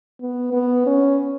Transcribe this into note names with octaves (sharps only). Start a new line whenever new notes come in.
B3
B3
C#4